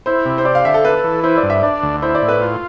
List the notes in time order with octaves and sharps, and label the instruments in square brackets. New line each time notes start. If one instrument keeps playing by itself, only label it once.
[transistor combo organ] E4 [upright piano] C5
[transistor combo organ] C3
[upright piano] C5
[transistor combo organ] G4 [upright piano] D5
[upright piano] F5
[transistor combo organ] D3 [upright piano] E5
[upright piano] A4
[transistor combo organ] A4 [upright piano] B4
[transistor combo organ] E3
[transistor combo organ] E4 [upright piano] C5
[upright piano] D5
[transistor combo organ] G2
[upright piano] E5
[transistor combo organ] D4 [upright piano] D5
[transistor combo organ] D2
[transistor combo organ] E4 [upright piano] C5
[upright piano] D5
[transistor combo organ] A2
[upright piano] B4
[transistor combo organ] F4